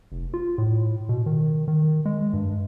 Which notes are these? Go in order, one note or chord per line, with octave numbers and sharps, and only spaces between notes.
F1
F4
A2
B2
D#3
D#3
G#3
G2